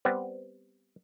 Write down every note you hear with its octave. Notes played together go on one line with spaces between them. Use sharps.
G3 B3 C4